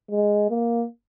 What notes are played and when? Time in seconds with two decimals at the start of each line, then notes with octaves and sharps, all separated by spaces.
0.11 G#3
0.50 A#3